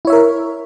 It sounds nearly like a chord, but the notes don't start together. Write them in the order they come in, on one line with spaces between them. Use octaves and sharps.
E4 C#5 E5 A#4